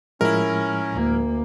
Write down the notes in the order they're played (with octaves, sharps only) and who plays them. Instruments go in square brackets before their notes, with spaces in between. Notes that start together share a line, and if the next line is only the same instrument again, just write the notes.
[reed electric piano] A2 F3 G#3 [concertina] C#4 [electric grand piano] E4 A#4
[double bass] D2 A#3